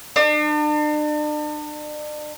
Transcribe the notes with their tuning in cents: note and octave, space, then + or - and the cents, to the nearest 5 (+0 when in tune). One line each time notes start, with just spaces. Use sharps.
D4 +40